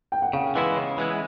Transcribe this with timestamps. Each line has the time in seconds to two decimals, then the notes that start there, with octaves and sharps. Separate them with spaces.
0.12 G5
0.22 F#5
0.33 C#3 F5
0.55 E3 G#3 B3 E4
0.77 C#3
0.98 E3 G#3 B3 E4